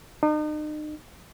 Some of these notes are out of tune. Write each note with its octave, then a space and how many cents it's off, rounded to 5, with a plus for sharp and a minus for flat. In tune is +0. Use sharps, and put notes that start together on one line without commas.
D#4 -40